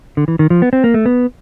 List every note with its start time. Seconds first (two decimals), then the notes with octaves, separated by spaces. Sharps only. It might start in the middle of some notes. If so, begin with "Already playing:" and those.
0.17 D3
0.28 E3
0.39 D#3
0.50 F3
0.62 B3
0.73 C4
0.84 A#3
0.94 A3
1.06 B3